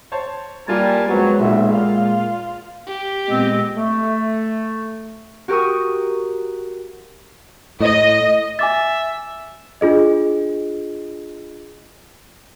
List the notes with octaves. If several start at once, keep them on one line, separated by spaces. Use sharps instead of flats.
C5 C#5 A5
G3 A#3 F4 A#4 G#5 A5
F2 F#3 G#3 B3
B1 F#2 A#2 E5
A#2 F4 F5
G4
A#2 G#3 B3 C4 D#5
A3
F#4 G4 A#4 C#6 D#6
A2 D#5
E5 G#5 D6 A6
D4 F4 G#4 D#5